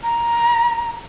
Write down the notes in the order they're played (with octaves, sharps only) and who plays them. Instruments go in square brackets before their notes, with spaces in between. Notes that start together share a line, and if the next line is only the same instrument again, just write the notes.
[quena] A#5